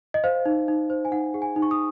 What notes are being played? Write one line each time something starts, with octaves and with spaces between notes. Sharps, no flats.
D#5
C5 F5
D#4
D#4
C5
G#5
D#4 F#5
G#4 F#5
G#5
D#4
C#6
D#6